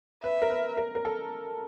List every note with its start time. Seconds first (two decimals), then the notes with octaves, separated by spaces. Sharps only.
0.23 B4 E5
0.42 A#4
0.50 B4
0.77 A#4
0.95 A#4
1.05 A4